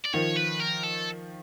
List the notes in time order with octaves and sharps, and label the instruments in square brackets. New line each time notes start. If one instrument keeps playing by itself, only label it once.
[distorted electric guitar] D5
[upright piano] D#3 F3 [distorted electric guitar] C#5
[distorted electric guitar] B4
A#4
A4